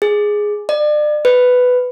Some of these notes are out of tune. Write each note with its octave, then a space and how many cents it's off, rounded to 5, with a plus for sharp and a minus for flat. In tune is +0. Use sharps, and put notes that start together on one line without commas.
G#4 +0
D5 +35
B4 +10